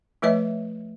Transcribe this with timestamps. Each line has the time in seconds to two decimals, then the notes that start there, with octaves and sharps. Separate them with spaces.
0.22 F3 A3 B4 C#5 D#5 E5